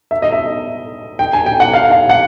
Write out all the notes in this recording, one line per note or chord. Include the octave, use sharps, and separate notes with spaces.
E5
D#5
E5
G5
G#5
G5
F#5
F5
F5
F#5